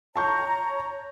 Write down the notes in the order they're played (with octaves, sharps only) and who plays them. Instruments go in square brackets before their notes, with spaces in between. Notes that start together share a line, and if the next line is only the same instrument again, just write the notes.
[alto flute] C#5 [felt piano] A5 C#6 G6 [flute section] A#5